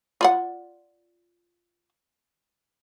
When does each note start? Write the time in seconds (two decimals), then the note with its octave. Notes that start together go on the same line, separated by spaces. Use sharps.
0.21 F4 D5 F#5